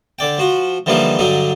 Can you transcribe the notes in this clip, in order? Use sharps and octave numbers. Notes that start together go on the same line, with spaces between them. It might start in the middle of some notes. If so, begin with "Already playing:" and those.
D3 D5 G5
F3 F#4
D3 E3 F3 G3 A#3 D#4
G2 D3 F#3 D#4